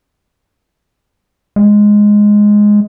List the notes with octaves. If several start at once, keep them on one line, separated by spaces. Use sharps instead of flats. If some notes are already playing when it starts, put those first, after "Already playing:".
G#3